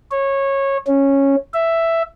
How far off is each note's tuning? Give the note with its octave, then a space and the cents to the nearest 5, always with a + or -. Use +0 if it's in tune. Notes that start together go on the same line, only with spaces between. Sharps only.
C#5 -20
C#4 -10
E5 +5